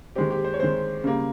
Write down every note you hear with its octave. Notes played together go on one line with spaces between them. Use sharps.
D#3 G#3 C4 G4
G4
C5
C#5
D#3 G#3 C4 C5
C#3 G3 A#3